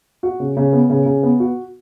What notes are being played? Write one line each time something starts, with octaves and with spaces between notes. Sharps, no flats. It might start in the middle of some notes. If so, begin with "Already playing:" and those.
F#4
C#3
C#3
B3
C#3
C#3
B3
F#4